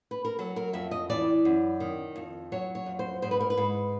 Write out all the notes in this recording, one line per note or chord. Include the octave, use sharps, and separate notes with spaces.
B4
A#4
F#3 A4
A#4
F2 E5
D#5
E3 D5
F#2
D#3
F2
F#3 C#5
C#5
F2
C5
G#2 C5
B4
A#4
B4
G#2